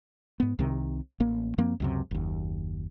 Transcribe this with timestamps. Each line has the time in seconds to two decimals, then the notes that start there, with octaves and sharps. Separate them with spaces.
0.40 G#2 B3
0.59 C2 C3 D#3 C4
1.20 A1 A#3
1.58 F#2 F3 A#3 C4
1.80 C#2 F#2 C3
2.11 F#1 D#2